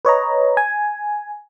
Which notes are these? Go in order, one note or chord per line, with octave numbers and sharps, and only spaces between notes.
B4 C#5 D#5 A#5
G#5